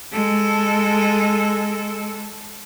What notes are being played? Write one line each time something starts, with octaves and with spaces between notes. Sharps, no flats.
G#3 A4